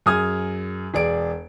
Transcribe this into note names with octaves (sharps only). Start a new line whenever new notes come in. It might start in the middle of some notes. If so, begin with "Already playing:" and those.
F#2 G#4 D#6 F6 G#6
E1 G#4 D5 D7